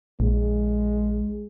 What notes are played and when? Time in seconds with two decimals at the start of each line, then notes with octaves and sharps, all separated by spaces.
0.20 A#1 G#3